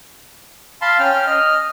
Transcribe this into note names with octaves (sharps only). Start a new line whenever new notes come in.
F5 A5 B5 C6
C#4 G5 F6
D#5 F6